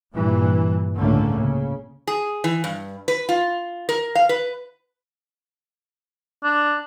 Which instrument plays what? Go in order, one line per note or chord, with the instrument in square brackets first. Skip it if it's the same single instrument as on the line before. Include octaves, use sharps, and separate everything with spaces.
[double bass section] G2 A#2 E3
C#2 A2 D3 A3 A#3 C#4
C#3
[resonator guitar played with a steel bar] G#4
E3
G2
B4
F4
A#4
F5
B4
[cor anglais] D4